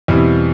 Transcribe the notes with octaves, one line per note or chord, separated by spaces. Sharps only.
E2 B2 G3 C4 E4